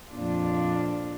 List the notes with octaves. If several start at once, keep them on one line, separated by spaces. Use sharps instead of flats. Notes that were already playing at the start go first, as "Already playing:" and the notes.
F2 A#2 D4 F4